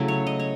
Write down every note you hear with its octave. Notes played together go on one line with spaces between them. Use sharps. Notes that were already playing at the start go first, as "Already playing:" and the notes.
Already playing: C#3 F#3 A3 E4
C#5
D#5
C#5